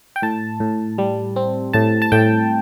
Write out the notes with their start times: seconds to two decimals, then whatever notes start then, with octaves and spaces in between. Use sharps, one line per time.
0.16 G5
0.22 A2 A5
0.60 A2
0.98 G3
1.36 C4
1.73 A2 A5
2.02 A5
2.12 A2 G5